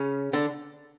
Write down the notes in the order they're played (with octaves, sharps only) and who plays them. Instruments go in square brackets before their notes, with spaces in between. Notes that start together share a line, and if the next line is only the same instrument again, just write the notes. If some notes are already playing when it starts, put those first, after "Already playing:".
Already playing: [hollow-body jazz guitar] C#3 C#4
D3 D4